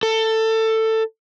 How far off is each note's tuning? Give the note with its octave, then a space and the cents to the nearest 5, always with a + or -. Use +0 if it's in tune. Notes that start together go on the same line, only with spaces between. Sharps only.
A4 +15